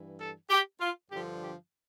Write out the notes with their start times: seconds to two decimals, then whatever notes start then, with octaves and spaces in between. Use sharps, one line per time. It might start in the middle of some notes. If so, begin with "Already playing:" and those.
Already playing: G2 E3
0.20 A4
0.50 G4
0.80 F4
1.11 G2 D3 F3 G4
1.41 G4